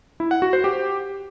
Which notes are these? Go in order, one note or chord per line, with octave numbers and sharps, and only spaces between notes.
E4
F#5
F#4
C5
G4